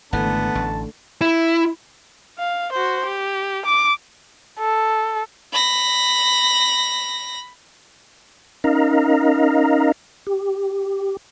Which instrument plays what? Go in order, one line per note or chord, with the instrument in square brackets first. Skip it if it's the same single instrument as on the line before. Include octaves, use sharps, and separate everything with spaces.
[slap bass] G#1 E3 [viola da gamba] D3 A3 [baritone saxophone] B3 [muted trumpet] A5
[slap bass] A1
[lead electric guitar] E4
[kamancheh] F5
F#4 C5
G4
D6
[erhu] A4
[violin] B5 A#6
[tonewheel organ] C#4 D#4 A#4 D#5 F5 A#5
G4